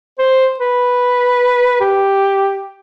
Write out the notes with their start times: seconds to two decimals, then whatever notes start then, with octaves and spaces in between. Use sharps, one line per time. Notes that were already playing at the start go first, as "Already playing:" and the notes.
0.18 C5
0.60 B4
1.81 G4